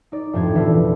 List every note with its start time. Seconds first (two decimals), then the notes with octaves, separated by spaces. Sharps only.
0.12 D#4 D5
0.33 F2 A2 D4 G4 C5 G#6
0.54 E1 E3 E4 F4 G4